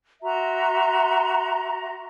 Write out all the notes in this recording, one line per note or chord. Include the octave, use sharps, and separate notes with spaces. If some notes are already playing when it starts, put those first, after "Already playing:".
F#4 E5 A#5 C6